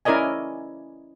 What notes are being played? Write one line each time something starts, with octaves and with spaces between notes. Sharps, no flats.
C#4 E4 A#4 D5 D#5 G#5